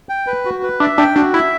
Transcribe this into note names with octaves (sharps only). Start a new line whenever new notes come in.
G5
B4
F#4
B4
D4 E5
D4 G5
D4 F#4
E4 E5